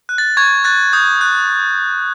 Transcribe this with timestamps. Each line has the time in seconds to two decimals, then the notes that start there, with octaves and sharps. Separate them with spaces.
0.09 F#6
0.18 A6
0.37 C#6 G#6
0.64 F#6 A6
0.93 D#6 G6
1.21 F#6